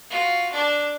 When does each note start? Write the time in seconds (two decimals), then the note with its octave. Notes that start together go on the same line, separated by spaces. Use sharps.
0.10 F4 F#4
0.52 D4 A5